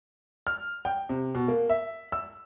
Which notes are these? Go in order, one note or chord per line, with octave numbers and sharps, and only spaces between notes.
F6
G5
C3
B2
A#3
E5
E6